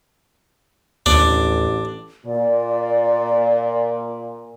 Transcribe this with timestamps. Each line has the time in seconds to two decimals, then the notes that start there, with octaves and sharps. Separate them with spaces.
1.06 A1 D#2 D4
2.26 A#2 D5